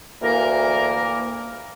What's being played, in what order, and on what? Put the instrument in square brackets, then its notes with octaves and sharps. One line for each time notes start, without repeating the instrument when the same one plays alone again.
[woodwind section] D2 E3 A#3 A#4